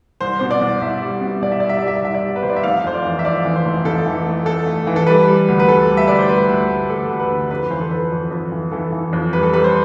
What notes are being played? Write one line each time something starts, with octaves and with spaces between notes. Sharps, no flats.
C2 C5
B2 C5
D5
C2
C2 E5
G3
B2
C2 D5
E5
G3 D5
E5
G3 D5
E5
D5
C2 E5
D5
G3
B4
C2 C5
D5
E5
F1 F5
F2 C5
D5
E3
E5
F2 D5
E3
C5
F1
F1 A4
E3
A3
A3 A4
A3
E3
A4
G3 B4
G3
D2
B4
D2 A4
G3
E5
D2 D5
C5
G3 B4
D2
D2
D2 A4
D2
B4
D3
F2 B4
E3 C5
A4
F2 B4
F2
F2
E3
E3 A4
E3
F2
G3 B4
A4
G3 B4
C5